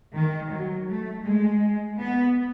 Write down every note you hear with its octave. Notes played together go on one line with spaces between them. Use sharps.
D#3
F#3
A3
G#3
B3